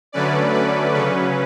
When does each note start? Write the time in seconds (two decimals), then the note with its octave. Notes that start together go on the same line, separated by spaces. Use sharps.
0.12 D3 F#3 A3 C#4 B4 D5
0.54 B4
0.93 C#3 F#3 C#4 B4